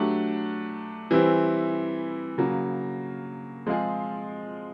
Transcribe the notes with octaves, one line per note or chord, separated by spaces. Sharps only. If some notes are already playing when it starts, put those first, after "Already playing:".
Already playing: F#3 A3 D4 G4
E3 G3 C4 E4
C#3 F#3 A#3
F3 G#3 C4 F4 G#4